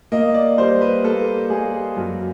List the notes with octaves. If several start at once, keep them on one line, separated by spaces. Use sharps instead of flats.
A#3 D#5
D5
G3 C5
B4
A#3 A4
A#3 G#4
F#2 F#4